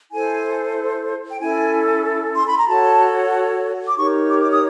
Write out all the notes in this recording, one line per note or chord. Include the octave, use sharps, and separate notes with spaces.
E4 A4 C5 G#5
G5
C#4 E4 A4 G#5
C6
B5
A#5
F#4 A4 C#5 A5
D6
D#4 G4 A#4 C#5 C#6
D6
D6
D#6